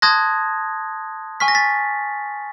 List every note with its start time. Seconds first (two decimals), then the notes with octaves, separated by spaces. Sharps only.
0.02 A5 C6 D#6 F#6 G#6 A#6
1.40 G#5 C#6 F6 B6
1.48 A#6
1.55 A6 B6